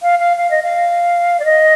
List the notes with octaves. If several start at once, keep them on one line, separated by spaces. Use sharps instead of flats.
F5
F5
F5
D#5
F5
D5
D#5